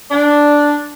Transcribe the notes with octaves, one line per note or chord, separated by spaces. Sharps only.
D4